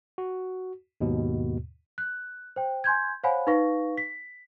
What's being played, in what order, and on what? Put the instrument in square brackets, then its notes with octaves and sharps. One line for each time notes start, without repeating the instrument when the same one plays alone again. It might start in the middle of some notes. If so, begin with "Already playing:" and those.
[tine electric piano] F#4
D#2 G#2 B2
[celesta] F#6
C5 G5
G#5 C6 G6 G#6
C5 C#5 F5 F#5 G#5 B5
D#4 B4 F5 C#6 A#6
B6